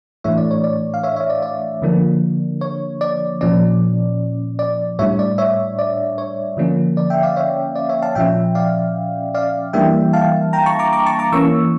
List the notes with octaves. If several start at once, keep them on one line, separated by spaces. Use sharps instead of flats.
A2 E3 A3 D4 C#5 E5
D5
C#5
D5
F5
C#5 E5
C#5 E5
D5
D5
D3 F3 A#3 D4
C#5
D5
A#2 F3 C#4 D5
D5
A2 G3 D4 C#5 E5
D5
C#5 E5
D5
C#5
D3 F3 A#3 C#4
D5
E5 G5
D5 F5
C#5 E5
D5
C#5 E5
F5 A5
A#2 F3 C#4 E5 G5
D5 F5
D5 F5
E3 G3 A#3 D4 E5 G5
F5 A5
G5 A#5
A5 C#6
A#5 D6
A#5 D6
A5 C#6
A#5 D6
E3 A#3 C#4 C#6 E6